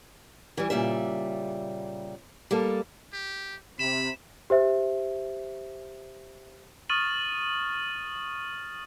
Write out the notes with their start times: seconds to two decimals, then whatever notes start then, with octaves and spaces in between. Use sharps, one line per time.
0.57 E3 G3
0.70 A#2 C#3 G3 E5
2.51 G3 A#3 A4
3.13 G4
3.79 C3 B5 E7
4.50 G4 C5 E5
6.90 C#6 D#6 F6 A6 D#7 F#7